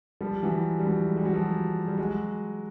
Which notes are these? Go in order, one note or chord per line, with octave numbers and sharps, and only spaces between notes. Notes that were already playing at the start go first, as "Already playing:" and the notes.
F3 G3
E3 F#3
G3
E3 F#3
G#3
G3
F#3
F3 G3
G3
F#3 G#3